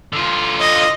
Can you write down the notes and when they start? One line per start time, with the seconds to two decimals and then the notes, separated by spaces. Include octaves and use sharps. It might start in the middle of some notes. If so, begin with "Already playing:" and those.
0.13 D3 F4
0.60 D#5